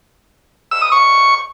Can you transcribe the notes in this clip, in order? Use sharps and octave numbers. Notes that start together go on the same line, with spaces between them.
E6
D#6
C#6